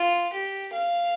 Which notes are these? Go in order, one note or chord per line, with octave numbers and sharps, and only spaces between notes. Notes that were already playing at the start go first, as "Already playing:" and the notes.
Already playing: F4
G4
F5